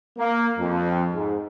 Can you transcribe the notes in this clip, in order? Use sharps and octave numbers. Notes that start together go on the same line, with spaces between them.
A#3
F2
G#2